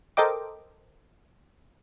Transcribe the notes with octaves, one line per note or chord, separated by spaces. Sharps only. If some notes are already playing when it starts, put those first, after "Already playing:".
A4 A#4 C5 D#5 G5 D6